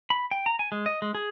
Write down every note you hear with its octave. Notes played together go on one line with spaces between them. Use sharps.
B5
G5
A#5
G#5
G#3
D#5
G#3
G#4